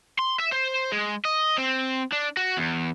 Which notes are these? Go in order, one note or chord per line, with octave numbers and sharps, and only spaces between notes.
C6
E5
C5
G#3
D#5
C4
D4
F#4
E2